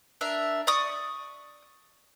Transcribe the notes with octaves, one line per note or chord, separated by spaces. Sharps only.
D4 A#4 E5
D5 C#6 D#6